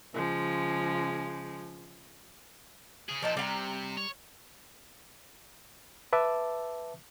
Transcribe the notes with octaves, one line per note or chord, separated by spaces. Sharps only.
C#3 F3 G#3
C#3 G#4
A#2 F3 D#4 A5
C3 G3 F5 A#5
C#5
B4 E5 A5 D6 E6